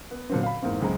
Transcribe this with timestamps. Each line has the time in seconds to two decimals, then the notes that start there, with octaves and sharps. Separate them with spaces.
0.11 B3
0.30 A#2 D3 F#3 B3 C4
0.43 F5 B5
0.63 E2 G#2 A#3 C4
0.81 C#2 F#2 G#3 C4 A#5